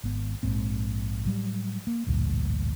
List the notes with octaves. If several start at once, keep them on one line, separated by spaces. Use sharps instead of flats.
G#1 B3
A#1 G#2 C4
A2 F#3 G3
A#3
A1 D2 G2 A#2